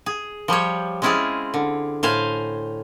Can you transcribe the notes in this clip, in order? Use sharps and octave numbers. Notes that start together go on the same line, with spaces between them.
G#4
F3 G3 G4 C#5
G#3 C4 C#4 E4 F4 G#4
D3
A2 C5 F5 G#5